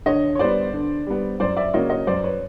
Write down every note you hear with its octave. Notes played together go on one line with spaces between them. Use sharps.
D3 C#5 D#5
C#5
G3 B3 C5 D5
D3
G3 B3
F#2 C5 D5
D5 E5
C#3 F#3 A#3 C#4 C#5 D#5
C#5 D#5
F#2 C5 D5
B4 C#5